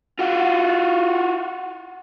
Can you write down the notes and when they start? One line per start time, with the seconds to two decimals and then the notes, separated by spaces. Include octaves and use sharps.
0.19 F4 F#4